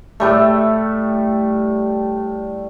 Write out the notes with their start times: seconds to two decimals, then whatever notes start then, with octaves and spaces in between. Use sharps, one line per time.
0.20 A2 G3 A3